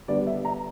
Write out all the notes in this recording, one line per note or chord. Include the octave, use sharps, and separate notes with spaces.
D3 G3 B3 D5
E5
A#5